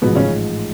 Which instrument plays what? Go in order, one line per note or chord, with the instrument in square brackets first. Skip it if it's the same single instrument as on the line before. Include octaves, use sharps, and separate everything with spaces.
[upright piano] A1 G#2 F3 G#3 [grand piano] B2 B3
[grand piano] C#3 C#4